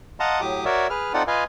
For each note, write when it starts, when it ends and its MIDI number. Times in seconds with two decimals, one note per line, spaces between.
0.20 0.41 75
0.20 0.41 77
0.20 0.41 78
0.20 0.41 81
0.20 0.41 82
0.20 0.41 84
0.41 0.65 45
0.41 0.65 54
0.41 0.65 67
0.41 0.65 86
0.41 0.65 87
0.65 0.87 66
0.65 0.87 70
0.65 0.87 73
0.65 0.87 74
0.65 0.87 76
0.90 1.13 68
0.90 1.13 71
0.90 1.13 89
1.14 1.23 60
1.14 1.23 63
1.14 1.23 65
1.14 1.23 69
1.14 1.23 74
1.14 1.23 78
1.27 1.44 65
1.27 1.44 71
1.27 1.44 75
1.27 1.44 77
1.27 1.44 80